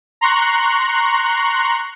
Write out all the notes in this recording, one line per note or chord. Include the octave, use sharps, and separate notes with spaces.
A#5 C6 C#6 F#6